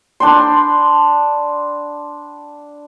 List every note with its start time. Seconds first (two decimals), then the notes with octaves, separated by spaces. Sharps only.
0.20 D4 G5 B5 C6